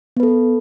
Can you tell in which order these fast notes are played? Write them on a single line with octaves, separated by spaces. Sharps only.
B3 B4 A4